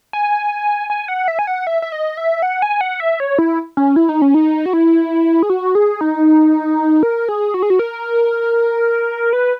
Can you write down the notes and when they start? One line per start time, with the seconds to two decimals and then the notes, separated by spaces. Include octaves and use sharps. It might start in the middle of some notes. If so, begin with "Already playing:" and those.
0.13 G#5
0.90 G#5
1.08 F#5
1.28 E5
1.39 G#5
1.47 F#5
1.67 E5
1.82 E5
1.92 D#5
2.17 E5
2.42 F#5
2.62 G#5
2.81 F#5
3.00 E5
3.20 C#5
3.38 E4
3.77 C#4
3.96 E4
4.09 D#4
4.22 C#4
4.34 D#4
4.66 F#4
4.73 E4
5.43 G#4
5.50 F#4
5.75 G#4
6.01 D#4
7.03 A#4
7.29 G#4
7.54 F#4
7.63 G#4
7.70 F#4
7.79 A#4
9.33 B4